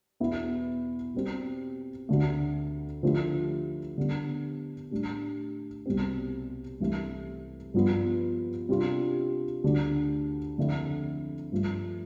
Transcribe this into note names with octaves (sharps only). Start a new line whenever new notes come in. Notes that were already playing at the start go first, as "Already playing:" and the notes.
E2 B2 B3 E4
B2 G3 C4
D2 D3 A3
D3 F3 A3 E4 G4
D3 G3 B3 D4
A2 G3 D4
C2 B2 G3 C4
C2 C3 E3 A3
G2 F3 B3 F4
C3 G3 D4 F4
D2 D3 G3 D4
F2 D3 A3 E4
G2 F3 A3